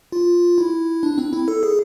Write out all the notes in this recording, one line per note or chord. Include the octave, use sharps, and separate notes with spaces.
F4
E4
D4
C4
E4
A4
G#4